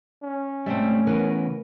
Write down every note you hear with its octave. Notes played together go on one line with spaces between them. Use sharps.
C#4
G#2 G3 A3 C4 E5
C#3 E3 B3 A#4 B4